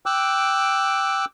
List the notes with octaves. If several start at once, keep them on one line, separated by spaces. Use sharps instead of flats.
G5 D6 E6 F#6